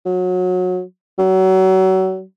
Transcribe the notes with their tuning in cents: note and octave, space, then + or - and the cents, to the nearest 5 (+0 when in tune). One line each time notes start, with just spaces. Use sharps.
F#3 -25
F#3 +30